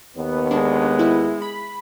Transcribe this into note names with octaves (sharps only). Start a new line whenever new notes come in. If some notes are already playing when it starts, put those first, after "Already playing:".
D#2 B3
G#3 D4
E4
B5